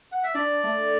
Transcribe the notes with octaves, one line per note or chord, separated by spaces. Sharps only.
F#5
E5
D4 D5
A3